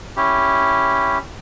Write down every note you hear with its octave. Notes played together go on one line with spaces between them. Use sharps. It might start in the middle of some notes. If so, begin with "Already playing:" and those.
C#4 E4 G4